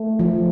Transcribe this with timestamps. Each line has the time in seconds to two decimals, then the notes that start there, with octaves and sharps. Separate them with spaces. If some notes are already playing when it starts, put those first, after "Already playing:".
Already playing: A3
0.19 F3